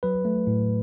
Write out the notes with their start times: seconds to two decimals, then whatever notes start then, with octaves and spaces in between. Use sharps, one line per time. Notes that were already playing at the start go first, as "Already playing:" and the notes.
0.03 F#3 B4
0.25 A3
0.47 A2